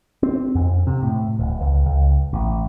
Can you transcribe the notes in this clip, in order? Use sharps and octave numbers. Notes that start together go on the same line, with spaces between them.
C4
F2
C3
A2
D1
C#2
C#2
A1